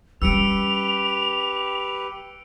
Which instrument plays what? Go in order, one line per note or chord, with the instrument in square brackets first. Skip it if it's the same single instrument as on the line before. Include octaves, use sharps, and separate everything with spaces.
[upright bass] G3 C#4 [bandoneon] G4 B4 [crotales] E6 C#7 D7 [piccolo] F7